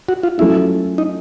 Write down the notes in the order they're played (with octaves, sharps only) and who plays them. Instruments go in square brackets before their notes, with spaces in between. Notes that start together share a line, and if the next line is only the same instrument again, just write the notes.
[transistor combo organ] F#4
F4
[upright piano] F#3 A3 C#4 F4 [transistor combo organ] E4
[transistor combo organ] D#4